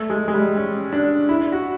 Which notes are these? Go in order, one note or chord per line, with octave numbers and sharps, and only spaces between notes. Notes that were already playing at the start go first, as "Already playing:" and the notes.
Already playing: A3
G#3
G#3
G3
C#4
D4
E4
F#4